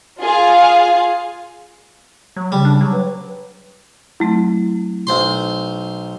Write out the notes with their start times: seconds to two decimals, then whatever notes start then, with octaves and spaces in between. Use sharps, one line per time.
0.20 F4 G#4 F5
2.36 F#3
2.52 C#3 G3
2.65 D4
2.81 F#3
2.92 B4
4.20 F#3 A3 C4 E4
5.07 B1 C5 C6